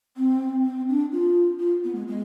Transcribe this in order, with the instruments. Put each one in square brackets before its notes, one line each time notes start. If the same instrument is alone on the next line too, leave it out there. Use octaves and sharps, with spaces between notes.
[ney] C4
C4
D4
F4
F4
B3
G#3
G#3